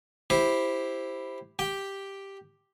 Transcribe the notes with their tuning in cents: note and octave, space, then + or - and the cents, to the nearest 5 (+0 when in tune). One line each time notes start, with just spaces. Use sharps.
E4 +0 G4 +0 C5 +0
G4 +0 G5 +0